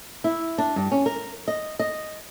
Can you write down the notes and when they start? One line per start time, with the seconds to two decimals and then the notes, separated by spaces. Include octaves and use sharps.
0.24 E4
0.58 D4
0.76 G2
0.92 C#4
1.06 A#4
1.48 D#5
1.79 D#5